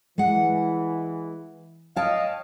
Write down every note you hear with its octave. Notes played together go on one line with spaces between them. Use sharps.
E3 G#3 F#5
C#5 D#5 F5 G5 A5